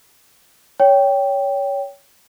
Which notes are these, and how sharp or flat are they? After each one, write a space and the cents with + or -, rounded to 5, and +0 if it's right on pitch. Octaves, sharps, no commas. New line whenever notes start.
C#5 +20 G5 +0